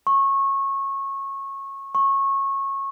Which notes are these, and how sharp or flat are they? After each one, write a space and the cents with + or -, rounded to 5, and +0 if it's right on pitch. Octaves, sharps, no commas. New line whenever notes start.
C#6 -20
C#6 -20